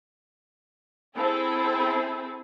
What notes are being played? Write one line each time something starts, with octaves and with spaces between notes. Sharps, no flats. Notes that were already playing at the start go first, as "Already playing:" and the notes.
C4 E4 G#4 A4